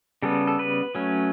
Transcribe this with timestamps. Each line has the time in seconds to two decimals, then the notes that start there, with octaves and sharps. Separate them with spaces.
0.22 C#3 G3 B3 A4
0.47 A4
0.59 B4
0.95 F#3 A3 C#4